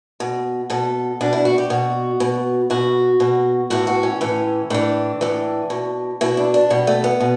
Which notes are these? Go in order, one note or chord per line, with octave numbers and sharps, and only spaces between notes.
B2
B2 A4
B2 D4
E4
F#4
G4
B2 F#4
B2
B2 F#4
B2
A2 E3 F#4
F#4
C#4
A2 E3
A2 E3 D4
A2 E3
B2
B2 E4
D4
D4
B2 G3
A3
B3
B2